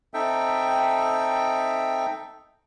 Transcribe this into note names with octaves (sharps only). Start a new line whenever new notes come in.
C4 D#4 A4 E5 G5